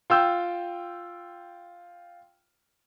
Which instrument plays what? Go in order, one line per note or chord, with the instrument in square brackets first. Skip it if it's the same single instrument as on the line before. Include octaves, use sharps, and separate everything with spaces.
[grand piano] F4 G5 E6 G6